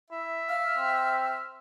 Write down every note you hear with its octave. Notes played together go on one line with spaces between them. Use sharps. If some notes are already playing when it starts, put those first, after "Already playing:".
E4 E5
F5 F6
C4